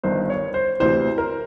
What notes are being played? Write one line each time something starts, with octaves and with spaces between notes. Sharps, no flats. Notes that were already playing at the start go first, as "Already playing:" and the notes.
G1 G2 D#3 C5
C#5
C5
D2 C3 E3 C5
A#4